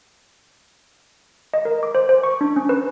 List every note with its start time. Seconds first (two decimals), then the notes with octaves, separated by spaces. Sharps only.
1.54 D#5
1.65 A#4
1.83 D6
1.95 C5
2.09 C5
2.23 C#6
2.41 D4
2.56 C#4
2.69 B4